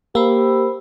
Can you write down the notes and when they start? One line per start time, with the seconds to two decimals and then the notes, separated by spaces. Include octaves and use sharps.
0.15 A#3 G4 C5 B5 E6